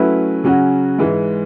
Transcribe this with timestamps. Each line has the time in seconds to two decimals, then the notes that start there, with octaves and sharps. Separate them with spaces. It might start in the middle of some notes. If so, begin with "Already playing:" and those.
Already playing: F#3 A3 C#4 E4 B4
0.44 C#3 F#3 C#4 F#4
0.99 G#2 E3 G#3